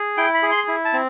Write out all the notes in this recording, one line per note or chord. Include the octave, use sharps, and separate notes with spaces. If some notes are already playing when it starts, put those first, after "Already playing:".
Already playing: G#4
E4 G5
B5
G#4
C6
E4
A5
C4